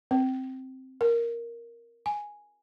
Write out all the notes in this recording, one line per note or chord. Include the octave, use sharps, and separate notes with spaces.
C4
A#4
G#5